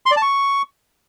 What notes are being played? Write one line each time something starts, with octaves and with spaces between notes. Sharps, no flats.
C6
D5
A5
C#6